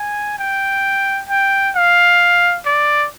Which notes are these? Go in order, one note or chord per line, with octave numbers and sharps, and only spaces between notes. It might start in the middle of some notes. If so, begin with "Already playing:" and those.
Already playing: G#5
G5
G5
F5
D5